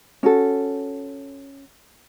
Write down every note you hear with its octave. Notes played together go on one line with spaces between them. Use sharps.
C#4 F#4 A4